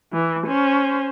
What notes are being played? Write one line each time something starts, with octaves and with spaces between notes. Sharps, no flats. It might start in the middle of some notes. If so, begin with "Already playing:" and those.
E3
C#4 C5